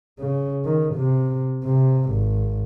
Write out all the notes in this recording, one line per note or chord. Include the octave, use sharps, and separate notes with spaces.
C#3
D#3
C3
C3
G#1